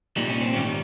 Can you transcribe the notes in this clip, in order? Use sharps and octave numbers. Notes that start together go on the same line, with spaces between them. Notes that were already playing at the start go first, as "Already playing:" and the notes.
C2 A#2 G3 D#4
C#4
C4
G#2 D#3 G3 C#4